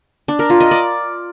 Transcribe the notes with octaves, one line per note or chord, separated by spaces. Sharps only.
D4
A#4
F4
D#5
D5